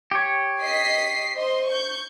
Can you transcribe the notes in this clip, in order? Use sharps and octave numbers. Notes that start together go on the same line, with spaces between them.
G4 C#5
D#5 B6 C7
C5 D#5 C6
C#6 G6